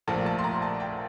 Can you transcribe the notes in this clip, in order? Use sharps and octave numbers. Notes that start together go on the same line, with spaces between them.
A#1 A#2 F3 A3 A5
A5
C6
A#5
A5
G5